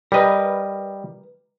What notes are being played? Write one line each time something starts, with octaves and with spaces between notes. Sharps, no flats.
G3 A#4 B4 D#5